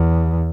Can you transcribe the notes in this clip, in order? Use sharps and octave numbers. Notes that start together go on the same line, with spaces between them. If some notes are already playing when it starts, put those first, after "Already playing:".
Already playing: E2